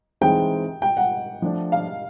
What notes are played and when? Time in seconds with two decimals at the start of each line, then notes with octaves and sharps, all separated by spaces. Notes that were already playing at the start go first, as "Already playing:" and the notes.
0.21 E3 G#3 C4 D#4 G5
0.82 G5
0.97 F#5
1.42 F3 A3 D4
1.72 F5